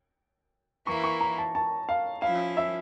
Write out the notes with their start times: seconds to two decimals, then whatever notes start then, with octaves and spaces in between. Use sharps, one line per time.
0.87 E3 A#3 E4 C#6
1.04 C#6
1.21 A#5
1.38 A5
1.55 A5
1.89 F5
2.22 F3 C#4 E4 F5
2.57 E5